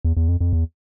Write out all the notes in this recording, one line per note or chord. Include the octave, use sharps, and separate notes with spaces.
E2
E2
F2
F2
E2